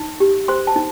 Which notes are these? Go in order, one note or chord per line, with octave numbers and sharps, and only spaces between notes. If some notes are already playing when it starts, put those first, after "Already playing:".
Already playing: D#4
G4
C5 C6
A5
D#4